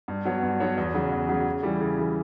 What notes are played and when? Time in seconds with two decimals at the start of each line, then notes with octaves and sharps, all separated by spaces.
0.08 G2
0.25 F#3 B3 F#4 C#5
0.43 G2
0.60 F#3 B3 F#4 C#5
0.77 E2
0.94 C#3 F#3
1.11 E2
1.29 C#3 F#3
1.46 C#3
1.63 E3 G3
1.80 C#3
1.98 E3 G3